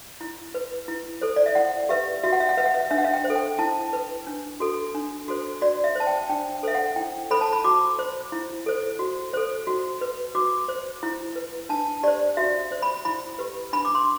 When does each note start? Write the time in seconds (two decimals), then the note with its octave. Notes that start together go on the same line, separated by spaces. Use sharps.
0.21 E4
0.54 B4
0.88 E4
1.21 A4 C5
1.36 D5
1.46 E5
1.55 E4 F#5
1.89 G4 B4 E5
2.23 F#4 E5
2.32 F#5
2.40 E5
2.49 F#5
2.57 B4 E5
2.65 F#5
2.74 E5
2.91 D4 E5
2.98 F#5
3.05 E5
3.14 G5
3.24 C5
3.30 A4
3.35 G5
3.59 E4 A5
3.93 B4
4.27 D4
4.60 F#4 A4
4.94 D4
5.28 F#4 A4 C5
5.62 F#4 D5
5.84 E5
5.95 C5 A5
6.07 G5
6.29 D4 G5
6.63 A4 C5 E5
6.75 F#5
6.96 E4 G5
7.31 A4 C5 B5
7.41 A5
7.53 B5
7.64 F#4 D6
7.99 C5
8.32 E4
8.66 A4 C5
8.99 F#4
9.33 A4 C5
9.67 F#4
10.01 B4
10.35 F#4 D6
10.68 C5
11.03 E4
11.36 B4
11.69 D4 A5
12.03 G4 C5 D5
12.37 F#4 E5
12.71 C5
12.82 B5
13.05 E4 B5
13.38 G4 B4
13.73 D4 B5
13.85 D6
13.95 C6